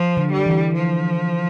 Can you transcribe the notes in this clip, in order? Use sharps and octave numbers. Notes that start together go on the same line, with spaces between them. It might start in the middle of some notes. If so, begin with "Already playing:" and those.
Already playing: F3
D3
G3
E3
F3